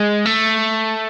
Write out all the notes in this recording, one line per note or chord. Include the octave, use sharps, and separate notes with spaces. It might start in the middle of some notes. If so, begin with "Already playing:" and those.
Already playing: G#3
A3